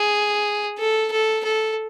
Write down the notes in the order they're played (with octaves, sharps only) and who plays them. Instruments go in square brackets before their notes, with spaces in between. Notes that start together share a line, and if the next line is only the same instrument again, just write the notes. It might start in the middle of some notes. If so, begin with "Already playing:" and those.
Already playing: [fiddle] G#4
A4
A4
A4